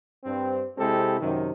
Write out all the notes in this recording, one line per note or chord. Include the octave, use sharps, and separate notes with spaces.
G2 C4
C3 G#3 C4 E4 G4 A4
F#2 C3 D#3